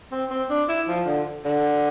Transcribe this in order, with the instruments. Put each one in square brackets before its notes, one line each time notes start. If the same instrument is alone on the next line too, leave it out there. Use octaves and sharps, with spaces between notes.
[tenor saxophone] C4
C4
D4
E4
F3
D3
D3